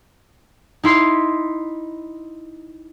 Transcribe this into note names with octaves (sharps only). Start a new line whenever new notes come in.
D#4 E4 C6 B6 C7